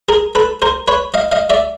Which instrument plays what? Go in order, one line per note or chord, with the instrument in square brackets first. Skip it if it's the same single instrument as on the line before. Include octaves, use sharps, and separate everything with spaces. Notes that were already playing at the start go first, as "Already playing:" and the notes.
[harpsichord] G#4 A#4
A4 B4
A#4 C5
B4 C#5
D#5 F5
D#5 F5
D5 E5